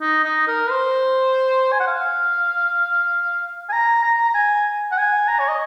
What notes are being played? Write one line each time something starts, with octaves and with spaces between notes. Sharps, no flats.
D#4
D#4
A#4
C5
G#5
F#5
F5
G#5
A#5
A#5
A#5
G#5
F#5
G#5
A#5
C#5
D#5